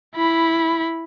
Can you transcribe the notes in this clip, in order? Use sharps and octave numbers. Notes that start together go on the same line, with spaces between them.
E4 B5